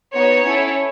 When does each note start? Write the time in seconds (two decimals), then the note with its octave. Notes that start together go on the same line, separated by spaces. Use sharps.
0.14 B3 D#4 F#4 C#5
0.43 C#4 E4 A4